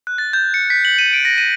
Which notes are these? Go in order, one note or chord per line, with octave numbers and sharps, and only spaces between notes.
F#6
A6
G6
C#7
B6
F#7
D#7
D7
A#6
D#7